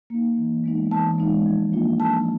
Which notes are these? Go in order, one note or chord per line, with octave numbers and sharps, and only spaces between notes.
A#3 D#4
E3
G#3 B3 D#4
E3 A5
G#3 B3 D#4
F3
A#3 D4 F4
F3 A5